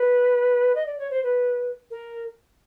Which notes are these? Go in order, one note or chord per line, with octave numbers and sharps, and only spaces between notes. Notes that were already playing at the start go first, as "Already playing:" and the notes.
Already playing: B4
D#5
D5
C#5
C5
B4
A#4